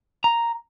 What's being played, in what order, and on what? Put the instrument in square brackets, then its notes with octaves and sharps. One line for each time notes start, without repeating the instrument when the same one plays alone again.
[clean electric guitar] A#5